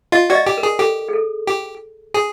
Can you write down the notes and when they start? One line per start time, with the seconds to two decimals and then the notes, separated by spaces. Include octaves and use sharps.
0.12 F4 D#5
0.30 F#4 D5
0.35 D#5
0.47 G4
0.58 A#4
0.63 G#4
0.79 G4 A4
1.09 G#4
1.13 A4
1.47 G4
2.14 G#4